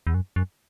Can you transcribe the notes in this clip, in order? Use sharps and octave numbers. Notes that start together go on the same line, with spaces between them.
E2
F#2
F#2